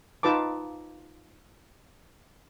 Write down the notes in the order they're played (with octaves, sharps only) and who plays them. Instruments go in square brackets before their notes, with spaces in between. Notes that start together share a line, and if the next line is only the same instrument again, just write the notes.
[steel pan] D#4 F4 B4 A5 D6